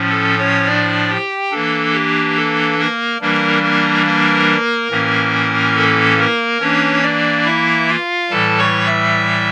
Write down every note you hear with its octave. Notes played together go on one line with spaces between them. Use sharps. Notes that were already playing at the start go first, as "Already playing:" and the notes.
Already playing: A2 F3 C#4
A4
C#4 C#5
D4 D5
G4 G5
E3 A#3 D4 A4
G4
A4
A#3 A#4
E3 G3 A#3 D4 A#4
A#3 A#4
A#3 A#4
A2 E3 A#3 C#4
A4
A#3 A#4
E3 A#3 C#4 D4 C#5
D4 D5
E4 E5
F4 F5
A2 E3 G3 A4 A5
C#5 C#6
E5 E6